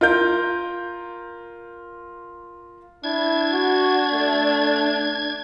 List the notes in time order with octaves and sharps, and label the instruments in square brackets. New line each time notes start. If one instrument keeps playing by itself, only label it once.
[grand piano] F4 A#4 G6
[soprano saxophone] D4 [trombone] E4 [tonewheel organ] G#6
[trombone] F#4
A3